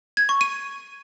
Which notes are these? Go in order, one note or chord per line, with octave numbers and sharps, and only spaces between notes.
G#6
C#6
D#7